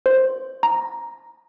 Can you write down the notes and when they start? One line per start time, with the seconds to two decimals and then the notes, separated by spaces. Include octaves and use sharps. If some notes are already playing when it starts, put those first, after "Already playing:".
0.06 C5
0.63 A#5